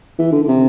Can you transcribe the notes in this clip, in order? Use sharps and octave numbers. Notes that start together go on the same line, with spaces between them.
E3
D3
D3
C3